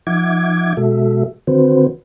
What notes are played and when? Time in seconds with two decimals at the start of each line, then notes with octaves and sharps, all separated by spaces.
0.07 F3 D#4 E5 F#5 D6 G#6
0.77 B2 G#3 F#4 A4 E5
1.47 D3 D#3 C4 F#4 B4 C5